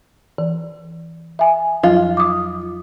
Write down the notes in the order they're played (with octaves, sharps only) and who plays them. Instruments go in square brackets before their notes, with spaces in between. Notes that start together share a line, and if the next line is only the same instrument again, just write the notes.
[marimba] E3
E5 G#5
[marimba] F2 F3 F#3 [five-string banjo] F4
[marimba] D6 D#6